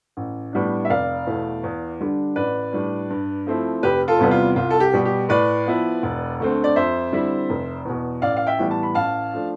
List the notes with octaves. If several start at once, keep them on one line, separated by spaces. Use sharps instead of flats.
A1
A2 G3 B3 D4
E5
F1 D5 F5
E2 B2 A3 E4
E2
D3 G3 D4
A1 B4 D5
A2 G3 D4
G2
F3 A3 C4 E4
F1 G4 B4
F4 A4
E2 C3 G3 B3
F4
C2 F4
A4
G4
B2 G3
G4
A2 B4 D5
F3 B3 E4
E1
D2 D3 A3 C4
D5
F2 C5 E5
D3 G3 C4 E4
F1
E2 B2
A1 D5 F5
F5
E5 G5
A2 E3 G3 B3
A5
B5
A1 F5 A5
F3 A3 D4